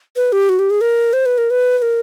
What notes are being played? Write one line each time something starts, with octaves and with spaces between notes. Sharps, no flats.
B4
G4
F#4
G4
G#4
A#4
C5
B4
A#4
B4
B4
A#4